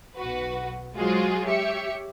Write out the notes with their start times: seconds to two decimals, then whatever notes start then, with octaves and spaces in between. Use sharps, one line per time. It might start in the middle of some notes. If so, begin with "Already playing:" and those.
0.17 B1 F#4 B4
0.96 F#3 G#3 F4 F#4 G#4 C5
1.44 G4 C#5 E5 C#7